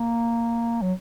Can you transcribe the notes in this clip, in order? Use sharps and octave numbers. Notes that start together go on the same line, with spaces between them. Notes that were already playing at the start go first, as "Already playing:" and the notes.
Already playing: A#3
F#3